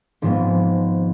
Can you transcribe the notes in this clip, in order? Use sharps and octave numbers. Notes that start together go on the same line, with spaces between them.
G#1 G#2 F3 G#3 B3